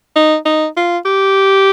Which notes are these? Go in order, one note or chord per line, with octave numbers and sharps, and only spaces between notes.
D#4
D#4
F4
G4